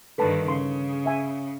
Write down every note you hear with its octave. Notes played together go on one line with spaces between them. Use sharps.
G2 D3 D#3 A4 B4 A5
C#3 C6
E5 G#5